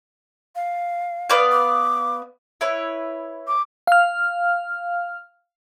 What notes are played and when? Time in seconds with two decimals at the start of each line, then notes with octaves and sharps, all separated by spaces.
0.56 F5
1.30 B3 D5 F5
1.51 D6
2.61 E4 B4 C#5
3.48 D6
3.87 F5 F6